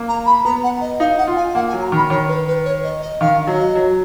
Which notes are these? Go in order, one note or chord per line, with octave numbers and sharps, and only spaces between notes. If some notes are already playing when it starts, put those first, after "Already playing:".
Already playing: A#3
A#5
B5
B3 A#5
F#5
D#5
D#4 F5
F#5
F4
G#5
A#3 F#5
G#5
F#3
A#5
D#3 B5
D#3 C#5
B4
B4
C#5
D#5
D#5
D#3 F5
F#3 D#5
F#3